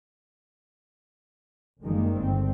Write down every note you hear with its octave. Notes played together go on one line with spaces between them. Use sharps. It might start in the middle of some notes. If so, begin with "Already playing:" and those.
F#1 D#3 G3 G#3 A#3
G1 C4